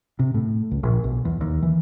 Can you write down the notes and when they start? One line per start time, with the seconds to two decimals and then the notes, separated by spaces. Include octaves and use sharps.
0.19 C3
0.34 A2
0.71 C#2
0.83 A#1
1.04 B1
1.25 E2
1.41 D#2
1.62 E3